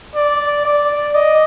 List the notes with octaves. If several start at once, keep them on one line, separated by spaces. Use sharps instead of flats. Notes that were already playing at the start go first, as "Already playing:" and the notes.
D5
D5
D#5